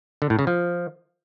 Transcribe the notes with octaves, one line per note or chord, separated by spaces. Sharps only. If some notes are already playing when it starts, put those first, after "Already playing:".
D3
A2
C#3
F3